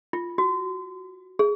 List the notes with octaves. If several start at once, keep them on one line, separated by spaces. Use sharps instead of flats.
F4
F#4
G#4